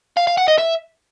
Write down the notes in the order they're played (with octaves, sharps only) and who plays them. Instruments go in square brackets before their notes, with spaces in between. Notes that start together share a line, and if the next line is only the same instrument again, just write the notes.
[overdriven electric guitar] F5
F5
F#5
D#5
E5